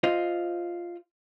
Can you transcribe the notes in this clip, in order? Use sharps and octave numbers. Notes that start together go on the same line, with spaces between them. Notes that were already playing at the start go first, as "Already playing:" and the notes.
F4 C5 D#5